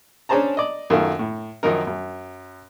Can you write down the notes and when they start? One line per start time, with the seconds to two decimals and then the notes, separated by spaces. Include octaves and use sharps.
0.29 C#4 D4 G#4 C5 A5 A#5
0.57 D5 D#5
0.90 F#2 D#3 A3 F4
1.19 A2
1.63 F#2 D#3 F3 D#4 A#4
1.87 F#2